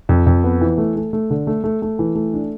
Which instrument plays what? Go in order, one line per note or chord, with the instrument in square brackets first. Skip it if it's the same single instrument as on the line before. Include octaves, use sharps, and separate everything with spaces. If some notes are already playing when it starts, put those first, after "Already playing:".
[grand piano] F2
F2
B3
E3
A3
A3
A3
D3
A3
A3
A3
E3
A3
D4